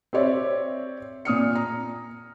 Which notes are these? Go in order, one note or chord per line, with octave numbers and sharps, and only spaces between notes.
C4 G4 C#5 D5 E5
A#2 D#6 F6 C#7
A#5